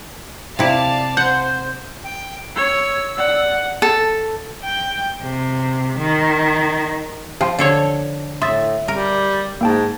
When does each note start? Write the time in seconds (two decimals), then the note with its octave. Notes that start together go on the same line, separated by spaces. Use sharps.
0.59 C3 E4 D5 F5 A5
1.17 C5 F#5 G6
2.04 G5
2.56 C#5 E6
3.17 D5 F#5
3.82 A4
4.64 G5
5.21 C3
5.97 D#3
7.41 F3 G4 G5 C6
7.59 D3 A4 C#5
8.42 A2 E5 C6 D#6 A6
8.88 G3 A#4
9.61 G#2 A#3 G5 A5